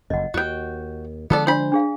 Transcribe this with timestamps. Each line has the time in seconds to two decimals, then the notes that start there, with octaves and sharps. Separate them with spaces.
0.10 F#1 F2 D#5 F#5
0.34 D#2 F#4 G5
1.30 D3 F3 G#3 B3 A4 D5
1.47 D4 C5 D5 B5
1.72 D4 G#4 F5